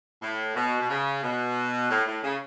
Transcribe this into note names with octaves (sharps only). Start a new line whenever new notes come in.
A2
B2
B2
C#3
B2
A2
A2
C#3